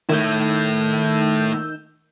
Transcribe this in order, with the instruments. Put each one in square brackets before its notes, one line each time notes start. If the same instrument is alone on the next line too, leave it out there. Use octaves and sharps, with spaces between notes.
[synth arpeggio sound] D#3 E6 G6 [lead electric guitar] A3 E4